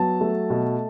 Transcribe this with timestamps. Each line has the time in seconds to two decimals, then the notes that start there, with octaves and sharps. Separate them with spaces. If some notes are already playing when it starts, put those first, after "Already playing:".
Already playing: F#3 B3 A5
0.21 A3
0.50 B2